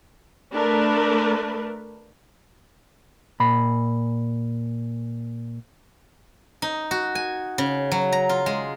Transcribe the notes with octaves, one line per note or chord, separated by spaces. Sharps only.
A3 D4 A#4 B4
A#2 B5
D#4
F#4
G#5
C#3
F#3
A#5
F4
G#3